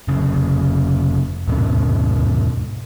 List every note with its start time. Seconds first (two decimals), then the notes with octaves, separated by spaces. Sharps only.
0.08 F1 C#3
1.48 D#2 G#2 B2 C#4